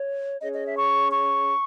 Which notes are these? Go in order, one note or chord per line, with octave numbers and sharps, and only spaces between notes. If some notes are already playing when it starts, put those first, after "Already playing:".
Already playing: C#5
C#4 G#4 C#5 D#5
D#5
E5
C#6
C#6